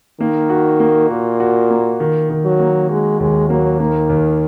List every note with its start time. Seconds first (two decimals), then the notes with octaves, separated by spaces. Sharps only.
0.20 D#3 A#3
0.50 F#4
0.80 A#3
1.10 A#2 F#4
1.40 F#4
1.71 A#3
2.00 D#3
2.30 D#3
2.45 F#3
2.60 A#3
2.89 G#3 F#4
3.20 D#2 G#3
3.49 F#3 A#3
3.80 D#3 A#3
4.10 D#2